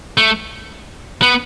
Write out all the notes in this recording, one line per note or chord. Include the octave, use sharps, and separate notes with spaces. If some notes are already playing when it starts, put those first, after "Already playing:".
A3
B3